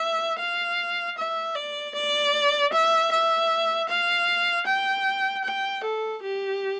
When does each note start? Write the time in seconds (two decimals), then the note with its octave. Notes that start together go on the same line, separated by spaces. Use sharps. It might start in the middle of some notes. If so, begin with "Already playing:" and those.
Already playing: E5
0.39 F5
1.18 E5
1.56 D5
1.95 D5
2.73 E5
3.11 E5
3.89 F5
4.66 G5
5.44 G5
5.83 A4
6.23 G4